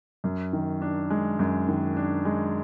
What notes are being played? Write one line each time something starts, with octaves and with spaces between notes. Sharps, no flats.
F#2
D#3
D4
G#3
F#2
D#3
D4
G#3